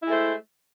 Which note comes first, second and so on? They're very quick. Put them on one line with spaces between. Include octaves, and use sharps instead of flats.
E4 G#3 A3 C5